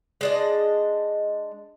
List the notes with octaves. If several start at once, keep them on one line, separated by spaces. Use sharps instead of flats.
G#3 D4 D#5